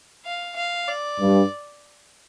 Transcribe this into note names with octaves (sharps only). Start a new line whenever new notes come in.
F5
F5
D5
G2